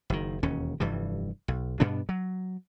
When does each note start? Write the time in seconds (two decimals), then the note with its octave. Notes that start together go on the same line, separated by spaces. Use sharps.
0.10 F#1 D#3
0.43 E1 D#2 C#4
0.80 F1 G2 E3 G3
1.48 B1
1.80 G2 B2 B3 D4
2.09 F#3